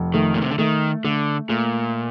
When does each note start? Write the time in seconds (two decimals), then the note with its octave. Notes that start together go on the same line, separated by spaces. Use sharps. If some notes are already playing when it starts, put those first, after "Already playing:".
Already playing: F1
0.14 D#3 A3
0.34 A#2
0.42 C3
0.51 D3
0.58 D#3 A3
1.04 D3 A3
1.49 A#2 A3